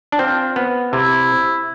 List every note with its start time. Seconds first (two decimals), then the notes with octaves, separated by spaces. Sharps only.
0.12 D4
0.19 C4 F4
0.56 B3
0.93 C3 E4